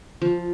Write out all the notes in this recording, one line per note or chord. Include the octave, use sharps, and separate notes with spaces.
F3